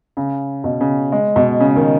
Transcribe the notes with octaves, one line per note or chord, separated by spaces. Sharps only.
C#3
B2
C#3
G#3
B2
C#3
D#3